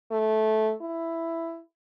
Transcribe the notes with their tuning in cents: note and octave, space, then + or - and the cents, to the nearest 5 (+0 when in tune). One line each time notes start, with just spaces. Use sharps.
A3 -15
E4 +5